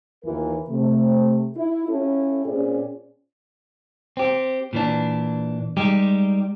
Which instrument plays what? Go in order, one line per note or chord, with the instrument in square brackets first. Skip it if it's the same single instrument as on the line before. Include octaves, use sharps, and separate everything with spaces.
[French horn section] D#2 E3 F4 A#4
C3 A3
E4
C#4 E4 F4 G4 A4
A#2 C4 C#4 F4 G#4 D5
[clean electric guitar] C4 G4
A#2 E3 D4
G3 G#3 D#4 G4